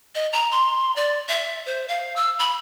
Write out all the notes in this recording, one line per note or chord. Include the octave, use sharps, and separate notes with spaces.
D#5
A#5
C6
D5
E5
C5
F5
E6
B5